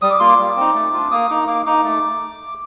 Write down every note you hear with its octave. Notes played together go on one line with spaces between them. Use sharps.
G3 D#6
D6
A#3 F4 C6
D6
G3
C4 D#4
A3
D4 F4
A#3 D#6
D#4 D6
A#3 D6
D#4 D6
A3